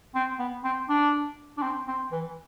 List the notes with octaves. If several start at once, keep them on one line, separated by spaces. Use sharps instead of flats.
C4
B3
C4
D4
D4
C4
C4
E3